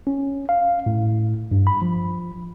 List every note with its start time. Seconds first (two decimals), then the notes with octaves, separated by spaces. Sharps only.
0.07 C#4
0.49 F5
0.86 A2
1.52 G2
1.67 B5
1.82 F3